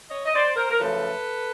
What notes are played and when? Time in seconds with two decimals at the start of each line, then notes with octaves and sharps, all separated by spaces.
0.11 C#5 D#5
0.26 D#5
0.34 C5 D5
0.56 A#4 C5
0.70 A#4
0.78 F#2 C#3 F3 A3 A4 B4